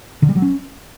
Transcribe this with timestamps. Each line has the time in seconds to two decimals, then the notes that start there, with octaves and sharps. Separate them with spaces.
0.22 D3
0.29 G3
0.35 F#3
0.42 C#4